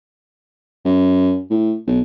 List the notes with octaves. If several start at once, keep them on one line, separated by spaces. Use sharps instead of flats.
F#2
A2
B1